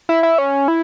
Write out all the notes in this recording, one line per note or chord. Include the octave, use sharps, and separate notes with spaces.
E4
E4
C#4
E4